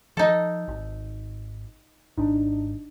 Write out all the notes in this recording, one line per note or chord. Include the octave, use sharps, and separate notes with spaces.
F3 D#4 A4
G#1
G#1 G#2 D4 D#4